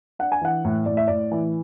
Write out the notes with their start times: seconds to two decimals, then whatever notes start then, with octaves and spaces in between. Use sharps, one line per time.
0.19 D4 F#5
0.32 G#5
0.41 E3 F#5
0.65 A2
0.86 A2 D5
0.97 E5
1.08 A2 D5
1.31 E3